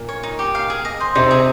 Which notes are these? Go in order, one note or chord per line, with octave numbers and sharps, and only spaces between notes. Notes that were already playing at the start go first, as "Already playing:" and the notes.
Already playing: A#2 A#3
C#5
D#4
G4
F5
G#4
D#5
C5
C3 C4 D#4
G#4